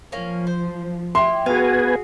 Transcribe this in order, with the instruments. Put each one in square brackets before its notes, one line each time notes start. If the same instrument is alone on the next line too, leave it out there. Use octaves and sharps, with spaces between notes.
[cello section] F3 [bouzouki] A#3 C#4
[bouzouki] C5
[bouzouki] E4 G4 [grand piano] C6
[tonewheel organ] B3 B4 G#5 [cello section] F#4 G#4 [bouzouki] F5